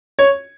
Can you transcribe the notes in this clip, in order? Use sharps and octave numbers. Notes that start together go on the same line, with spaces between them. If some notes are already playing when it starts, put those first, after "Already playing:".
C#5